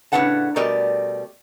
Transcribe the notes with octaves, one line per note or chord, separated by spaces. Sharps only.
A2 C#3 D4 B4 F#5 A5
B2 G3 A3 A#4 D5 D#5